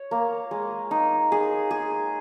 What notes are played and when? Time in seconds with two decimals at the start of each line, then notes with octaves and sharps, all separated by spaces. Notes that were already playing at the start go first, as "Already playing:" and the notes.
Already playing: C#5
0.11 A#3
0.51 G#3
0.91 D#4
1.32 G#4
1.71 G#4